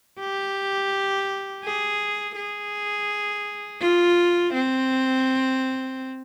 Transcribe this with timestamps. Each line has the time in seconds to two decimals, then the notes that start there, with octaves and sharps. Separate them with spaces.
0.20 G4
1.64 G#4
2.36 G#4
3.81 F4
4.53 C4